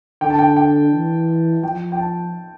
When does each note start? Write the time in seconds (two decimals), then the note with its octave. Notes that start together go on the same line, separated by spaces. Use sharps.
0.21 D3 G5
0.30 A5
0.39 G5
0.56 G5
0.93 E3
1.63 F3 G5
1.92 G5
1.98 A5